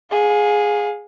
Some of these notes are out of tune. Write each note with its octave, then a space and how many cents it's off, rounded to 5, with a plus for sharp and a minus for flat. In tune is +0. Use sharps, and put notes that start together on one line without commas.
G#4 +0 F5 +35